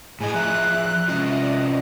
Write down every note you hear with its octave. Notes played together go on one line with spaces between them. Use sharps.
A2 G#4 D#5 G#5
F3 G#4 E5 A#5 F#6
C3 C#4 F4 D#5
D5